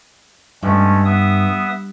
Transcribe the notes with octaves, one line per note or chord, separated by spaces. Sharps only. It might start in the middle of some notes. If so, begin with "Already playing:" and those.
G2 G#3 A3 C#4
B3 E5 D#6